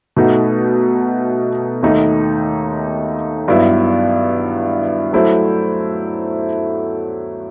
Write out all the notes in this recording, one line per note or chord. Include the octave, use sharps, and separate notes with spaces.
B2 A3 D#4 F#4
D#2 D#3 A3 D#4
G2 F#3 B3 E4
F#3 A3 E4 A4 C5